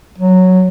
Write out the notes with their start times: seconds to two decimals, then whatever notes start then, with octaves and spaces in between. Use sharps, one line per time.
0.18 F#3